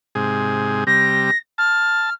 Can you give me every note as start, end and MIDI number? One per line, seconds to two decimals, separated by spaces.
0.15 0.84 44
0.15 0.84 48
0.15 0.84 68
0.87 1.31 48
0.87 1.31 55
0.87 1.37 94
1.58 2.10 81
1.58 2.13 89